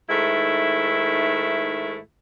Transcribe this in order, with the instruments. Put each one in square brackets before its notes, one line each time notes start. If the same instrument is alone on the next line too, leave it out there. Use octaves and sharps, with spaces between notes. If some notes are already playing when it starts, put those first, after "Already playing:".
[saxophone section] G#2 D#3 A3 E4 E5